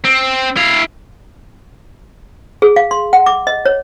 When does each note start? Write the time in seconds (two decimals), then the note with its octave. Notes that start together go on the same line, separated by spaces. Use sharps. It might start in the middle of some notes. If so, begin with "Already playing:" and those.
0.05 C4
0.56 E4 F5
2.62 G#4
2.76 F5
2.91 C6
3.13 F#5
3.26 D6
3.47 D#5
3.66 C#5